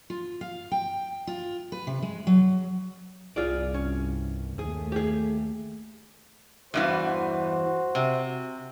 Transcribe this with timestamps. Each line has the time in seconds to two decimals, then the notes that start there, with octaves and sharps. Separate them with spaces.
0.10 F4
0.41 F5
0.72 G5
1.27 F4
1.72 B4
1.87 C3
2.03 G#3
2.27 F#3
3.36 C2 G2 F4 G#4 D5
3.74 C#4
4.59 D#2 A3 G#4
4.92 G4 G#4
6.74 E2 G2 E3 F#4 C5
7.95 C3